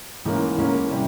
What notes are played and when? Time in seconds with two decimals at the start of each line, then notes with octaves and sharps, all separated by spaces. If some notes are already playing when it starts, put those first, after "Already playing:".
0.25 G#2 E3 A#3 C#4
0.57 G#2 E3 A#3 C#4
0.90 C3 G3